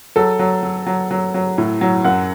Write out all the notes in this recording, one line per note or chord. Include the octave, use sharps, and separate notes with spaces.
F#3 A4
F#3
F#3
F#3
F#3
F#3
A2
F#3
F#2 F#5